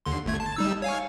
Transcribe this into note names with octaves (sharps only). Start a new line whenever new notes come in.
D#2 D3 C6
G1 A3 G#6
A5
G3 D#4 E6
C#5 F5 G#5